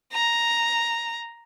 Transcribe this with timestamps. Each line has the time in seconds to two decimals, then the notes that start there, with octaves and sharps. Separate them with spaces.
0.13 A#5